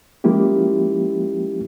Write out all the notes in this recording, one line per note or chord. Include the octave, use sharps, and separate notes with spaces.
F3 G#3 A#3 C#4 E4 G4